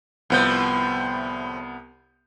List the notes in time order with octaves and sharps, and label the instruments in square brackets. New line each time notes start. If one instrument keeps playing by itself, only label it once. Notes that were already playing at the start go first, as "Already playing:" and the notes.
[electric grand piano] C2 B3 G6 [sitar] A2 F3